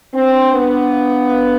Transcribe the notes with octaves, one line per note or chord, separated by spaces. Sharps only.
C4 D4
D4
B3 D4
D4
F5
F5
F5